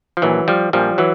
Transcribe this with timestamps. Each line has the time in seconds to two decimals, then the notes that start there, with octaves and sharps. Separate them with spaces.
0.17 F3
0.22 A#1 A#2 E3 F#3
0.48 F3 G3
0.73 A#1 A#2 F3 G3
0.98 E3 F#3